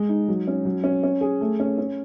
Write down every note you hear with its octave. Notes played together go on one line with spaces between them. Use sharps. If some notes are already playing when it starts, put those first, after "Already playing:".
Already playing: G#3
D#4
F#3
C#4
F#3
C#4
C#4
G#4
A3
C#4
C#4